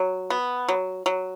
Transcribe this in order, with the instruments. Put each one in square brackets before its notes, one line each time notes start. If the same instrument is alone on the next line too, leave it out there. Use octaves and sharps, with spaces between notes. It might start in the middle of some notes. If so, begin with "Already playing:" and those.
Already playing: [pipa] F#3
B3
F#3
F#3